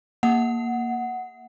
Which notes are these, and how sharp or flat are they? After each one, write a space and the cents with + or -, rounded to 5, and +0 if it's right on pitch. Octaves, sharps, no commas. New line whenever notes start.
A#3 +5 F#5 +0